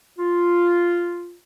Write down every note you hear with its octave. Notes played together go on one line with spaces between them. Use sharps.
F4